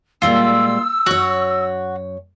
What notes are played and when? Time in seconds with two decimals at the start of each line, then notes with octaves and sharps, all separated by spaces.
0.22 A#2 G3 G#3 F4 E6
1.06 F#2 F#4 C#5